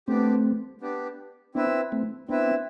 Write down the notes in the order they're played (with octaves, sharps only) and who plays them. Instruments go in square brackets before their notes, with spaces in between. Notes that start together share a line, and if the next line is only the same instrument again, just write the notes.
[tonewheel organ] A3 C4 [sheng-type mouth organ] B3 D4 G4
[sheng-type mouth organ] B3 D4 G4
[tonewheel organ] B3 D4 [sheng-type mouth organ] C4 E4 B4 E5
[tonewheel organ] A3 C4
[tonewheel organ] B3 D4 [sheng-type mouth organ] C4 E4 B4 E5